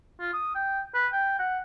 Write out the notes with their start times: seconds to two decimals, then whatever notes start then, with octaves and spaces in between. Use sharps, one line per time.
0.20 F4
0.33 D#6
0.55 G5
0.94 B4
1.12 G5
1.39 F#5